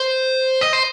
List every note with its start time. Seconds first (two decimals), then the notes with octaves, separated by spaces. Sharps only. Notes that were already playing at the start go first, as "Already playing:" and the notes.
Already playing: C5
0.61 D#5
0.73 C5